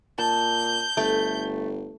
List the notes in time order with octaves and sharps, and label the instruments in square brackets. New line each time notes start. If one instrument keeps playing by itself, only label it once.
[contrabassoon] A#2 [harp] A5 [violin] G6
[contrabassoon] G1 [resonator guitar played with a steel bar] A3